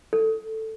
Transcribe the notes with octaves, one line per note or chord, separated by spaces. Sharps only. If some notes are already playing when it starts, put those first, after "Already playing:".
A4